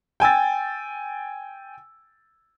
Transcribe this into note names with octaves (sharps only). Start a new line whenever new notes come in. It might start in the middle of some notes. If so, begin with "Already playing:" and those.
G5 G#5 E6 A6